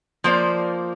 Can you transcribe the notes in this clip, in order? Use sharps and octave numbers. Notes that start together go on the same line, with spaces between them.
F3 A#3 C5 D5